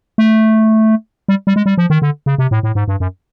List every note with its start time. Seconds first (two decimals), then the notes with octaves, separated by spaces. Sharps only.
0.18 A3
1.29 G3
1.47 G3
1.56 G#3
1.66 G3
1.78 F3
1.90 D#3
2.02 D3
2.26 C#3
2.38 C3
2.51 A2
2.63 A2
2.75 G#2
2.88 G2
3.00 F#2